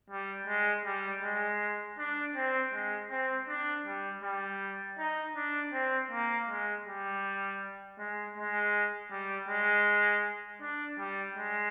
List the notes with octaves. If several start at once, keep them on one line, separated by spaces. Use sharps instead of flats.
G3
G#3
G3
G#3
D4
C4
G#3
C4
D4
G3
G3
D#4
D4
C4
A#3
G#3
G3
G#3
G#3
G3
G#3
D4
G3
G#3